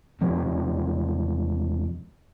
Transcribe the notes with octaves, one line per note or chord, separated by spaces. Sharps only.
E1 F3 C4